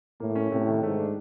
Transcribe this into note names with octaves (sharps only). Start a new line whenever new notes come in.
A2 A#3
C#4
A2 C3
D#3
G#2 A3
D4